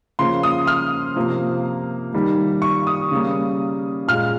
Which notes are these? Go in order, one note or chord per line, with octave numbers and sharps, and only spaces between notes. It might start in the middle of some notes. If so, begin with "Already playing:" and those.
C#3 F3 A#3 C6
D#6
F6
C3 F3 A#3
D#3 G3 A#3
C#6
D#6
C#3 G3 A#3
A#2 G#3 F6